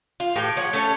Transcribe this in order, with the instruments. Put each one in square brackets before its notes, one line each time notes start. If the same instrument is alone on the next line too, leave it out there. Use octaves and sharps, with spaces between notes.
[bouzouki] F4
A2 G4 B4 G5
F3 C#5 F#5
A3 C#4 A4 C#5